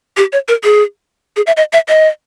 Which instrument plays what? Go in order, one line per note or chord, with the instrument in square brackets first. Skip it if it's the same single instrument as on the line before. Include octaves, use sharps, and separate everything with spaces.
[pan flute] G4
C#5
A#4
G#4
G#4
E5
D#5
E5
D#5